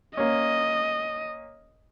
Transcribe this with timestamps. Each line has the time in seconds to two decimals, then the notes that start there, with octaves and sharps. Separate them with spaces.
0.17 A#3 C#4 D#5